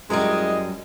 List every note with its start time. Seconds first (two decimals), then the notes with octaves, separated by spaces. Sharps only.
0.10 F#2 G3 G#3 E4 D#5